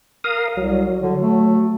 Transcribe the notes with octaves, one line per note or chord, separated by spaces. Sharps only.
A#4 F5 D#6
C2 F#3
D3
A3